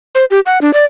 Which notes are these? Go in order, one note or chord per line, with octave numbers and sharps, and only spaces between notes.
C5
G4
F#5
D4
D5